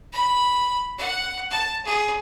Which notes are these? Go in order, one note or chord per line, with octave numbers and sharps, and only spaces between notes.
B5
F#5
A5
G#4